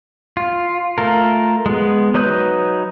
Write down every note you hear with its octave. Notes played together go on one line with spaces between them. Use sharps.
F4
A3 F4 A#4
G#3 B3
F#3 D#4 B4 D#6 G6